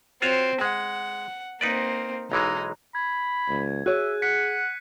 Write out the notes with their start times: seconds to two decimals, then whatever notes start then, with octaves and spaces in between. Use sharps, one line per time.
0.22 C4 F4 F#4 C#5
0.61 G#3 F#5
1.61 A#3 C4 D#4 B4 D5
2.32 B1 E3 G#3 D#4
2.95 B5 G#6
3.49 C#2
3.86 F#4 G#4 C#5 E5 F#6 D#7
4.22 F#5 B6 C#7